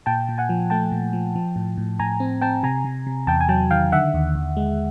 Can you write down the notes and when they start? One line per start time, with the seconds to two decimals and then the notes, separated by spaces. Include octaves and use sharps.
0.06 A#2 G5 A5
0.28 A#2
0.38 F#5 G#5
0.49 F3
0.70 A3 G5 A5
0.92 A#2
1.13 F3
1.36 F3
1.56 A2
1.77 A2
1.99 A2 G#5 A#5
2.20 C4
2.41 C4 G5 A5
2.63 C3 G#5 A#5
2.84 C3
3.07 C3
3.27 E2 G5 A5
3.41 G#5
3.49 F#3 G5 A5
3.71 D#3 F5 G5
3.92 D3 E5 F#5
4.14 D#2
4.35 D#2
4.57 G#3